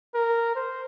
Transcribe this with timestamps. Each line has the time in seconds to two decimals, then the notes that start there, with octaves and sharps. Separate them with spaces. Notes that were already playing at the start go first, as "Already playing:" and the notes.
0.15 A#4
0.56 C5